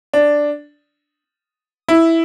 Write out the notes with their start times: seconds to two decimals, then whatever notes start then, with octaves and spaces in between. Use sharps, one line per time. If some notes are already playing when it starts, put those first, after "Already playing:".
0.13 D4
1.88 E4